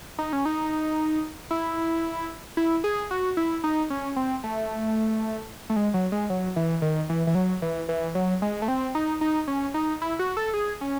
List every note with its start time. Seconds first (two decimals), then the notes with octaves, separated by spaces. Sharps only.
0.18 D#4
0.33 C#4
0.45 D#4
1.51 E4
2.57 E4
2.84 G#4
3.11 F#4
3.37 E4
3.64 D#4
3.90 C#4
4.16 C4
4.44 A3
5.70 A3
5.76 G#3
5.94 F#3
6.12 G#3
6.30 F#3
6.56 E3
6.82 D#3
7.09 E3
7.27 E3
7.35 F#3
7.62 E3
7.89 E3
8.15 F#3
8.42 G#3
8.62 A3
8.68 C4
8.95 D#4
9.21 D#4
9.48 C#4
9.74 D#4
10.02 E4
10.19 F#4
10.37 A4
10.54 G#4
10.81 C#4